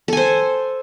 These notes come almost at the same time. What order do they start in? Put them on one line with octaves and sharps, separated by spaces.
A4 G#5 C5